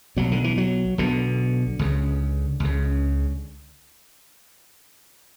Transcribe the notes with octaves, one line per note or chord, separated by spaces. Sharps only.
B1 B2 F#3
D3
E3
F#3
B1 B2 D3
C#2 C#3
C#2 C#3